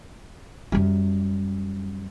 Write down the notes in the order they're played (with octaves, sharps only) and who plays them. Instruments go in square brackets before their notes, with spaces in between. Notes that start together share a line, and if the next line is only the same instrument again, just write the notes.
[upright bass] F#2 G3